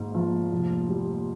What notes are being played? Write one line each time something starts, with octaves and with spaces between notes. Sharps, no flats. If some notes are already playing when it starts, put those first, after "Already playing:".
Already playing: G#1 G#2 A#3
F3
F1
G3